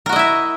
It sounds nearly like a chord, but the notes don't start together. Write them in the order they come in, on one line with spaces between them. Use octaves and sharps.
A#4 F#4 D#5 E4 E5